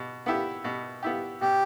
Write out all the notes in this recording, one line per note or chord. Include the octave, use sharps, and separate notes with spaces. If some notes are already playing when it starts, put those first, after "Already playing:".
Already playing: B2
B3 E4 G4
B2
B3 E4 G4
B2 G4